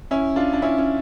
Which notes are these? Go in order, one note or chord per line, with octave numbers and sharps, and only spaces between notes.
C#4 E4
D4 F4
D4
C#4 E4
C#4